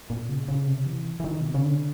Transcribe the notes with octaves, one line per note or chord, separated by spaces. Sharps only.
A#2
C#3
C#3
C3
E3
E3
D#3
B2
C3
C#3
D3